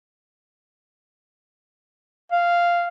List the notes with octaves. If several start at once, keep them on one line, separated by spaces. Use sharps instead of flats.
F5